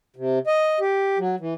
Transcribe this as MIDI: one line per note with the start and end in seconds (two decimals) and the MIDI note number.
0.16 0.39 48
0.47 0.79 75
0.80 1.18 67
1.19 1.36 54
1.40 1.54 52